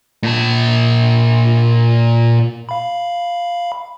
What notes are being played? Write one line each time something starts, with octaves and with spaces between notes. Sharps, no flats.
A#2 A5
F5 B5